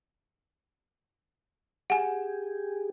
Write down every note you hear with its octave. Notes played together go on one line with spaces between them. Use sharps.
G4 G#4 F#5 G#5